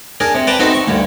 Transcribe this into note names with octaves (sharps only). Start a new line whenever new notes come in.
D4 G#4 A#4
C3
B4 D5 G5 A5 A#5
B3 C4 D#4 F#4 A4
C#6
D2 G2 D3